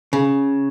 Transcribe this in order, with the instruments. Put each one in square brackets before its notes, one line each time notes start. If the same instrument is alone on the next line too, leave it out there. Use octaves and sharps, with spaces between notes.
[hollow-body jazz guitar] C#3